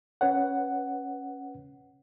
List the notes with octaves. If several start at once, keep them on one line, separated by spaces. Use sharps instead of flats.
C#4 B4 C#5 F#5